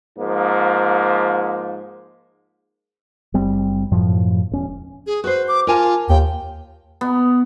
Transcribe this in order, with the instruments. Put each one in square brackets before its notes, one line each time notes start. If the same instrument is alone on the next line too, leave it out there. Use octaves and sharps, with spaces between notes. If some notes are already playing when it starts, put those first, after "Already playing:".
[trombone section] G#2 F3 A#3
[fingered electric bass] F#1 G3 C4
F#2 A2 F3
E1 C#4
[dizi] G#4
[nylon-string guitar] F#4 C5 [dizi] B4
[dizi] D6
[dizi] F4 [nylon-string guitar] A#4 G#5 A5
[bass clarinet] D#2 [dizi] G5
[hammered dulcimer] B3